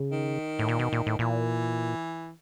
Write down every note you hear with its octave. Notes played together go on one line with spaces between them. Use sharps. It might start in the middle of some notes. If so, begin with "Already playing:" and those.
Already playing: C#3
D#3
A2
A#2
B2
A#2
A2
A#2 E3